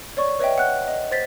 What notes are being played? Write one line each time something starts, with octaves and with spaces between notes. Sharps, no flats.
C#5 D5 C#6
B4 C#5 D#5 E5 G5
F#5 F#6
D#5
C5 A6 B6